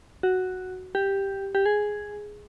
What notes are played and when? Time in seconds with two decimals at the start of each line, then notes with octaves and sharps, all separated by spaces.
0.23 F#4
0.95 G4
1.55 G4
1.66 G#4